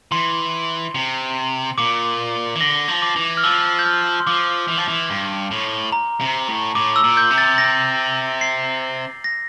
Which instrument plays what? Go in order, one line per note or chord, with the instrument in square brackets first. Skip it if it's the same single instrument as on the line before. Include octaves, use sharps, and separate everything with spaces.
[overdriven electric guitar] E3 [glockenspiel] C6
[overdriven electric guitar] C3
[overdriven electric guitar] A#2 [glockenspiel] D6
[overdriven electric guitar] E3
[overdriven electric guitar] D3 [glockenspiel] A#6
[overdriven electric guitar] F3
[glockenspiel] D6
[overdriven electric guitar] E3
[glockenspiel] F6
[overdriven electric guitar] F3 [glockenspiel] E6
[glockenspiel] G6
F6
C6
[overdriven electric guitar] F3 [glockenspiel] D6
[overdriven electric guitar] E3
F3
E3
G2
A2
[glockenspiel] A#5
[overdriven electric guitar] C3
A2
[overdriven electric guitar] A2 [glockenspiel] D6
[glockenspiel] E6
[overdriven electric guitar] A#2
[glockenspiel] G6
[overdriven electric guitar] C3
[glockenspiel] A6
A#6
C7
A#6